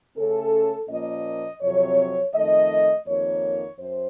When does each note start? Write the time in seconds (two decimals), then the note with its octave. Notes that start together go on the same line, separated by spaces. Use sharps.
0.17 C#3 A3 C#4 A4
0.89 A#2 F3 A#3 C#4 D#5
1.62 F2 C3 F#3 C4 C#5
2.34 F2 D#3 A3 D#5
3.07 F2 D#3 A#3 C#5
3.79 F#2 C5